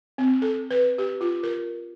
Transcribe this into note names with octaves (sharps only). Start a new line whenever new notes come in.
C4
A4
B4
G4
F4
A#4